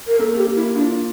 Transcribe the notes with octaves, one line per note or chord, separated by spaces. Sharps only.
A#4
A#3 A4
A4
G4
A#3
E4
D4 F4